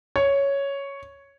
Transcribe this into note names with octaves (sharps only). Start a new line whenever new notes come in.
C#5